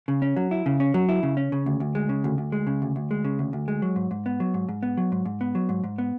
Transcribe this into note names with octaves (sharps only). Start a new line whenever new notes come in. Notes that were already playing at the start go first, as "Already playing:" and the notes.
C#3
C#4
F#3
E4
C#3
C#4
F#3
E4
C#3
C#4
C#3
D2
D2
G#3
C#3
D2
D2
G#3
C#3
D2
D2
G#3
C#3
D2
D2
G#3
F#3
G#2
G#2
B3
F#3
G#2
G#2
B3
F#3
G#2
G#2
B3
F#3
G#2
G#2
B3